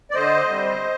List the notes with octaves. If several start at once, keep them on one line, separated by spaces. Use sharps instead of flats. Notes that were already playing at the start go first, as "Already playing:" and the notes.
D5
D3 C5 D#5
G3 C4